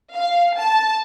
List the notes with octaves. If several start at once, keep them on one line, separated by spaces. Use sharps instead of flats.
F5
A5